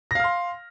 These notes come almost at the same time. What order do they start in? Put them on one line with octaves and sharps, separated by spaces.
A#6 F5 F6 C6